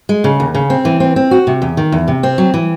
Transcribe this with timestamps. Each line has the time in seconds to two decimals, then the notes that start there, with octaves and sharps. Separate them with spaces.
0.09 G#3
0.24 C#3
0.40 D#2
0.55 C#3
0.70 C4
0.85 E3
1.00 C4
1.16 C4
1.31 F#4
1.47 C3
1.62 E2
1.77 D#3
1.92 E2
2.08 C3
2.23 C4
2.38 F#3
2.54 E3